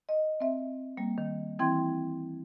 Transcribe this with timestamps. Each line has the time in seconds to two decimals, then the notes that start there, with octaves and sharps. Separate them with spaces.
0.09 D#5
0.40 C4 E5
0.97 G3 A#3
1.18 D#3
1.59 E3 C4 E4 G5 C6 G#6